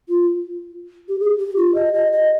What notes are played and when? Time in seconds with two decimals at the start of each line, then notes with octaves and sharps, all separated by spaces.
0.09 F4
1.09 G4
1.20 G#4
1.38 G4
1.57 F4
1.75 D#5
1.94 D#5
2.12 D#5